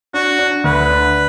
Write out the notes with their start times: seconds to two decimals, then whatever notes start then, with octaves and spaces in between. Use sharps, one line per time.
0.14 D4 F#4
0.39 D4
0.64 D2 B4
0.90 D4